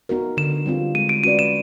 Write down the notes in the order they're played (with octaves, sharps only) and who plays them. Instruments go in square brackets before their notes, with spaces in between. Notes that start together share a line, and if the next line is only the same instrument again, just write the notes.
[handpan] B3 D#4 F#4 A#4
[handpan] D3 [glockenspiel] E7
[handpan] G3 C4 F4
[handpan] G#3 [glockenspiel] D#7
[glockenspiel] D7
[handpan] C#4 F#4 B4 D5 [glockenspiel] D#7
[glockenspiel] E7